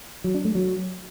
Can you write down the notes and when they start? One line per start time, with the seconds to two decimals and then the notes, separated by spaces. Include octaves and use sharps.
0.24 F#3
0.35 D4
0.45 A3
0.55 F#3